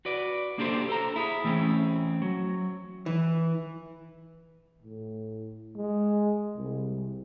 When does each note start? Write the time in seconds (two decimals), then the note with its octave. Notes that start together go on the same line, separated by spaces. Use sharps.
0.05 F#4 B4 D5
0.58 A#3 D4 G4 A4 C5
0.89 A4 C5 A#5
1.16 E4 G#4
1.44 E3 A3 C4 C#4
2.22 F#3
3.06 E3
4.83 A2
5.76 G#3
6.57 C2